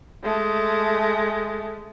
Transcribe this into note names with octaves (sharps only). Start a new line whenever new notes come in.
G#3 A3